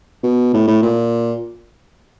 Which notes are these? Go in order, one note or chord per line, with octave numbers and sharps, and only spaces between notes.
B2
A2
A2
A#2